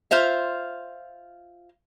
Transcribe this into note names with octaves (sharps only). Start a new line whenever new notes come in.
F4 C5 E5 F5